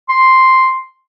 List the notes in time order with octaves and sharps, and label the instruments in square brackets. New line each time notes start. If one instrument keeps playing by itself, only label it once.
[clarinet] C6